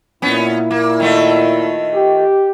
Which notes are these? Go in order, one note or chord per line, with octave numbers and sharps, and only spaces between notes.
A#2 B3 C#4 E4
A#3
D#3 A3 F4
G4